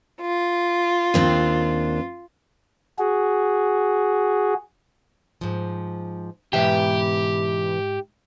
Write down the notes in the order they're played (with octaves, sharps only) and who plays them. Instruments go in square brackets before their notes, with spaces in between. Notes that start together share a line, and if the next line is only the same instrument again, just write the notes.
[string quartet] F4
[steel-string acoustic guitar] D#2 C4 D4
[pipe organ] F#4 G#4
[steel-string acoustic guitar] G#2 F3
[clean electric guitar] G#2 E5 G5 [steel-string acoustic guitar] B2 E3 B4 [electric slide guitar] G4